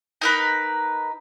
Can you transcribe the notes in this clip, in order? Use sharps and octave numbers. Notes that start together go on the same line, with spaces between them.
D#4 A#4 B4